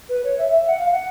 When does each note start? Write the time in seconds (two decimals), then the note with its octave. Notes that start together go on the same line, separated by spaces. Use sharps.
0.08 B4
0.23 C#5
0.37 E5
0.52 E5
0.66 F#5
0.78 F5
0.91 F#5